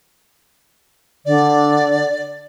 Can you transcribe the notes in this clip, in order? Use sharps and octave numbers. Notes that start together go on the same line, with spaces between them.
D3 D5